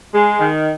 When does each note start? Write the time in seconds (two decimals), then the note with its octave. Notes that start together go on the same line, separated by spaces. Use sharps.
0.13 G#3
0.38 D#3